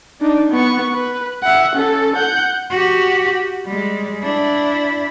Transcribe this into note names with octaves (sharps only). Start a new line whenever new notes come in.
D4 D#4
B3 C#6
B4
E5 F#5
C#4 A4
F#5 G6
F#4 G4
G3 G#3
D4 E4